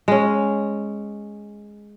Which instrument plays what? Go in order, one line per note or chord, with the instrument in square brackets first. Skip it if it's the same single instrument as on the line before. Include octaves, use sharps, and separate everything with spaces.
[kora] G#3 C#4